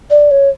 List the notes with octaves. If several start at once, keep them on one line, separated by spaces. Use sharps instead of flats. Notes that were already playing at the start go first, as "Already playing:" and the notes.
D5
C#5